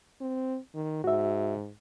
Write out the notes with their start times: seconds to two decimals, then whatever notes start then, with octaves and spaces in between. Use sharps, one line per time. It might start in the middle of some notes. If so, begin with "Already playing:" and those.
0.21 C4
0.74 D#3
1.04 G#2 F#4 E5